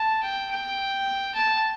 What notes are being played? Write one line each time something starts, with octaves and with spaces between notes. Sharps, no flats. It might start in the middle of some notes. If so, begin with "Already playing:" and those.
Already playing: A5
G5
G5
A5